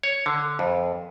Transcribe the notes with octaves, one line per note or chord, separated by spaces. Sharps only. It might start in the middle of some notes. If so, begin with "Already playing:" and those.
C#5
D3
F2